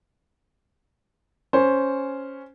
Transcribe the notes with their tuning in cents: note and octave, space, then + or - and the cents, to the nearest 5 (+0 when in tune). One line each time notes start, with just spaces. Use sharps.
C#4 +0 C5 +0